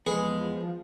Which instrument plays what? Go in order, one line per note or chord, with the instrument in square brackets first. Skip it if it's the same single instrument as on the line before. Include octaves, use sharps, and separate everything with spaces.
[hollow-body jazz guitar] E2 B3 [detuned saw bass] F3 [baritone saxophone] G#3 [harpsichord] G#4